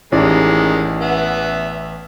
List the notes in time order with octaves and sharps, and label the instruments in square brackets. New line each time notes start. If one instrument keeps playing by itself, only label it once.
[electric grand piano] A1 D5 [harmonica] D#3 G#3 [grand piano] C#4 E4 G4
[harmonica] B3 E5